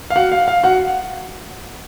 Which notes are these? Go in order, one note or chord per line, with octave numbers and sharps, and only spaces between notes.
F5
F#4 F#5
F5
F5
F#4 F#5